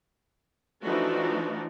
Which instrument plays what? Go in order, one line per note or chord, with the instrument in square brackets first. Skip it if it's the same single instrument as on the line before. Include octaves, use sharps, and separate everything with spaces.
[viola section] E3 F3 A3 D4 D#4 F#4